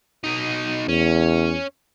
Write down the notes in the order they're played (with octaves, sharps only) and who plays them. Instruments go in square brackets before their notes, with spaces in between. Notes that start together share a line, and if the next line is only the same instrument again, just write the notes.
[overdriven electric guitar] B2 D#4
[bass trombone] E2 [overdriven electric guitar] C#4